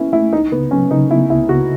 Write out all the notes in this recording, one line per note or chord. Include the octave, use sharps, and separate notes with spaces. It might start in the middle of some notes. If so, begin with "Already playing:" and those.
Already playing: B3 C#4 E4
A3 E4
C#2 D#4
C#3 B3
F#3 C#4
C#3 D#4
B3 E4
C#2 E4
C#3 F#4